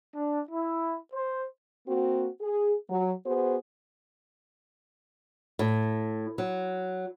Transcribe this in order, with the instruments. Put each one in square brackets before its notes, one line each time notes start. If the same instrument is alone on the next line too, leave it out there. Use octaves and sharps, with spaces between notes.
[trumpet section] D4
E4
C5
[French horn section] A#3 C4 F#4
G#4
F#3
B3 F#4 G#4 C5
[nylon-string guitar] A2
F#3